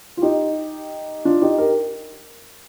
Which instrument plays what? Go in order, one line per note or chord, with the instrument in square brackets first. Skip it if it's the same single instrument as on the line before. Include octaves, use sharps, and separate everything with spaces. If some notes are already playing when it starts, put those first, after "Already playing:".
[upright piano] F4
D#4 G4
D4 F4
D#4 G4
G4 A#4